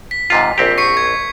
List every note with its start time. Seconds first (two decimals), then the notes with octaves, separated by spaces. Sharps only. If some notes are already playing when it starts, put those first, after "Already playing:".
0.11 B6
0.30 G#2 C3 F4
0.58 A#1 C4 G4
0.78 C#6 C7 C#7
0.97 G#6